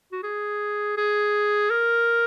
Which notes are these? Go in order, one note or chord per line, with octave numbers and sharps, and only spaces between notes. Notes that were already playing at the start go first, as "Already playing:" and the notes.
F#4
G#4
G#4
A#4